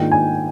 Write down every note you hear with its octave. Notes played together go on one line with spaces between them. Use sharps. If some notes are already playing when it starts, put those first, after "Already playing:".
Already playing: G#2 D#3 A#3 D4 F4 G5
G#5